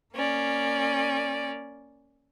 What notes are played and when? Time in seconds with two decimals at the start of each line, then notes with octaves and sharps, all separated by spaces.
0.16 A#3 C#4 D5